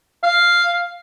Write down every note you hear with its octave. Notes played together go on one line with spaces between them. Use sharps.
F5